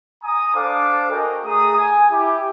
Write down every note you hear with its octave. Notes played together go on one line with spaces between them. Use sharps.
G#5 A#5 D#6
D4 A4 C5 F5 D6
F#4 A#4 D#5 G5 G#5
A3 G#4 A#5 D#6
G#5
E4 G4